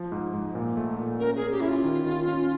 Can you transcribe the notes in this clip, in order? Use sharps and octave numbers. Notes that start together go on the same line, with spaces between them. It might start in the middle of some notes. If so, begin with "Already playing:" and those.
Already playing: F3
G#2
G#2
A#2
A3
A#2
C#4 A#4
G#4
C#4
G4
C#4 E4
F4
D#3
D#3
C#4